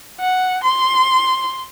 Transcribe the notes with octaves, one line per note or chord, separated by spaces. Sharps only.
F#5
C6